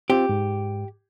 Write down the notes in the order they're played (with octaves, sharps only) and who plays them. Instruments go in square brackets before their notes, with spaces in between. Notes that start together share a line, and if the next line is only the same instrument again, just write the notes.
[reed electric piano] C4 F4 [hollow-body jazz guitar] G4
[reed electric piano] G#2